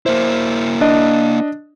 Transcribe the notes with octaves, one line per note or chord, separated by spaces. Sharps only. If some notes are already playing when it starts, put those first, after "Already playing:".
A#3 E4 C5
D4 D#5